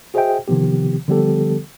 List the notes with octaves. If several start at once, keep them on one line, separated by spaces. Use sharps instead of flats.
F#4 G#4 C5 D#5 E5 G5
C3 D#3 F3 B3 G4
D3 F3 G3 B3 G4 A4